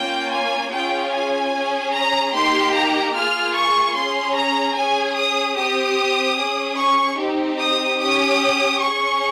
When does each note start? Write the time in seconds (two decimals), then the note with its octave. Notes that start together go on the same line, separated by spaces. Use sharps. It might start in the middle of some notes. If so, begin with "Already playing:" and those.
Already playing: A#3 C#4 F4 G5
0.32 G#5
0.72 C#4 F4 G#4 G5
1.12 G#5
1.52 C#4 G#4
1.93 A#5
2.33 A#3 D#4 G4 C6
2.74 A#5
3.14 A#3 F4 G#4 F6
3.54 C#6
3.95 C#4 G#4 C6
4.35 A#5
4.75 C#4 G#4 G#5
5.16 D#6
5.56 C4 G4 D#6
6.38 C#4 G#4
6.78 C#6
7.19 C4 D#4 G4
7.59 D#6
7.99 C#4 G4 D#6
8.80 C#4 G#4 C#6